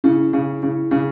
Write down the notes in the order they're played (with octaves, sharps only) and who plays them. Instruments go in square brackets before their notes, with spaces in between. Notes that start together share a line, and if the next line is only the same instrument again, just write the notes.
[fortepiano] C#3 [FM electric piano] C#4 E4
[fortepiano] C#3
C#3
C#3